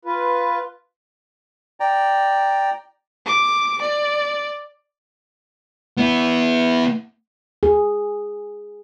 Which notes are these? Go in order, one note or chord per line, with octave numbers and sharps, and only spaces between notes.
F4 B4
D5 G5 A#5
D6
D5
B3 E4
G#4